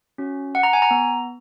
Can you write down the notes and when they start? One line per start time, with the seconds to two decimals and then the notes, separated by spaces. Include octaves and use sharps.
0.18 C#4 F#4
0.55 F#5
0.63 A#5
0.73 G#5
0.82 A#5
0.91 B3